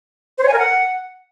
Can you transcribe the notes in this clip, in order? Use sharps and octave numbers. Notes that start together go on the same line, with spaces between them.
C5
C#5
G#5
A#4
F#5